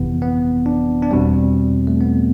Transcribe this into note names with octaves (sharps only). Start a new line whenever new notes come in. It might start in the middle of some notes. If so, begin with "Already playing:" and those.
Already playing: G1 F2 C3 E3 B3
B3
D4
D4
E2 B2 G3 C4
A3
B3